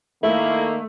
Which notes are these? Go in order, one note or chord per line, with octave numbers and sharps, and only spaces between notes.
D#3 A3 A#3 E4 A4